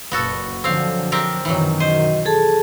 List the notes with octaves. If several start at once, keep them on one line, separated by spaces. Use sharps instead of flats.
F#1 A#2 B3 F#4 A4
D3 F3 F#3 C4 F5
C4 G4 A#4
F#2 B2 D#3 E3 F#3
C5 D#5
G#4 A4 A5